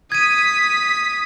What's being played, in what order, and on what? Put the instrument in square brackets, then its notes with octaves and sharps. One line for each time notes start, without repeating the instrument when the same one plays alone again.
[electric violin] D#6 B6 [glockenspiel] G#6 D#7